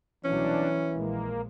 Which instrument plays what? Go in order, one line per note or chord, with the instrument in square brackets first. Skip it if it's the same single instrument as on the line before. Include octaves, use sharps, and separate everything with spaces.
[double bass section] C2 B2 F#3 [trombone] E3 [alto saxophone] C#4 [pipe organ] D4
[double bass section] A#1 G#3 [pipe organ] A#3